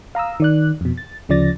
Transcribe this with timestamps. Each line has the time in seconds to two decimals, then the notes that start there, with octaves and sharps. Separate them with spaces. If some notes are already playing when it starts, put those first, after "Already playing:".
0.15 F5 A#5 D#6 E6
0.40 D#3 D5 F#6
0.81 F2 B2
0.98 A6
1.29 D2 C#3 F3 D5 A6 A#6